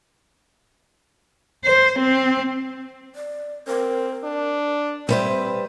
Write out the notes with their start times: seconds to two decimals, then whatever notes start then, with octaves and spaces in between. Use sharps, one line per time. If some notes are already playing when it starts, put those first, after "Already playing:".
1.64 C5
1.99 C4
3.16 D5
3.67 C4 A#4
4.24 D4
5.09 G3 C4 B4 C5 E5